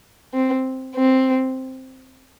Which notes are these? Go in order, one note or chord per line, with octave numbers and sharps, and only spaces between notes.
C4
C4